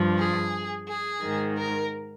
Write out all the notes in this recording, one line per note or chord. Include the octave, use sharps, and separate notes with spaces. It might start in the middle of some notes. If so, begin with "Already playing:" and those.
Already playing: G2 F3
G#4
G#4
G#2 D#3
A#4